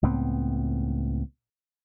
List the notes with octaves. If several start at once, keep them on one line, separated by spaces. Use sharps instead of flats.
C#2 A2 B3 C4